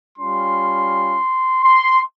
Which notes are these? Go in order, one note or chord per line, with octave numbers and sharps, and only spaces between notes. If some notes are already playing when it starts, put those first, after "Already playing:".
G3 C#4 F4 C6
C6